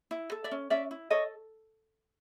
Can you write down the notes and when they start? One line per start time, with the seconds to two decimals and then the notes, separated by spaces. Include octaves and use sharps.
0.11 E4
0.32 A4
0.44 D5 E5
0.51 C#4
0.70 C#4 D5 E5
0.91 E4
1.10 A4 C#5 D#5